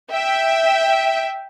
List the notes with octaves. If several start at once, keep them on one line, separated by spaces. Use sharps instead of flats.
E5 G5